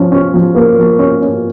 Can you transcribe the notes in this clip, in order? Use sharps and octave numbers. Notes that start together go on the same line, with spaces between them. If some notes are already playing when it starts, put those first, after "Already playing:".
Already playing: F3 C#4
C#4
F3
A#3
F3
C#4
C#4